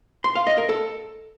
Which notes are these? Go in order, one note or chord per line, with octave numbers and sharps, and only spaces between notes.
C6
F5
D#5
A#4
A4